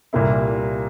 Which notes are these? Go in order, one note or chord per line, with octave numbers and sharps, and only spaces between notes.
C2 A#2 G3 A#3 E4